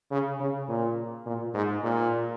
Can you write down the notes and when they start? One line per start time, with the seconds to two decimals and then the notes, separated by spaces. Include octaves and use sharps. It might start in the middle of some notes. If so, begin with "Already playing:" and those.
0.11 C#3
0.40 C#3
0.68 A#2
1.26 A#2
1.54 G#2
1.83 A#2